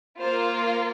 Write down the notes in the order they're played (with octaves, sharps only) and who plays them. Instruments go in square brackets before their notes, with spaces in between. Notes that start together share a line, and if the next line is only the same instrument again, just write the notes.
[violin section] A#3 F4 C5